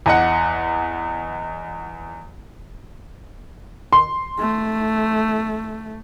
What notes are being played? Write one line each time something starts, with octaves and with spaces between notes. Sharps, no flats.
E2 D#5 F#5
C6
A3